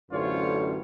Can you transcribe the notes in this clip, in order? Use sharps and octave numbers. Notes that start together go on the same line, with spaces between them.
A1 F#2 D3 F4 C5 C#5